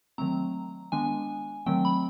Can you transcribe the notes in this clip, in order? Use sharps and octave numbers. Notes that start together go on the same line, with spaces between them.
D#3 F#3 A3 C4 A#5
D#3 G#3 B3 D4 G#5
D#3 F#3 A3 C4 G5
B5